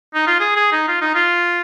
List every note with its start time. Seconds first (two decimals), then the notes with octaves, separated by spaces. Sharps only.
0.14 D#4
0.27 F4
0.40 G#4
0.56 G#4
0.72 D#4
0.88 F4
1.01 D#4
1.15 F4